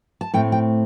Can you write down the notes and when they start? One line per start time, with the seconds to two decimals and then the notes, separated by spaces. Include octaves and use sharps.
0.21 A5
0.34 A2 A3 C4 G5
0.52 G5